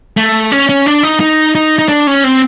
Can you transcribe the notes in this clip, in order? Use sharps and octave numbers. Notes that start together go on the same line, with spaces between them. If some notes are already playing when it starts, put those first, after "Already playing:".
A3
C#4
C#4
D4
D#4
D#4
D#4
D#4
D4
C#4
C4